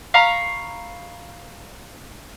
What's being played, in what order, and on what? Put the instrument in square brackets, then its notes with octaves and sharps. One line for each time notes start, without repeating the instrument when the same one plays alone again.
[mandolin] F5 A#5 B5 C#6